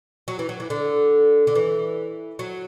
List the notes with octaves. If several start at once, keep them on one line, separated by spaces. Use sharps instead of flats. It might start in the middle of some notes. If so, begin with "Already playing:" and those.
F#3
E3
F#3
E3
D3
D3
E3
F#3